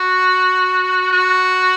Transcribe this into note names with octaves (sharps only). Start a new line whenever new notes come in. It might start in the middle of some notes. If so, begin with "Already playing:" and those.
Already playing: F#4
F#4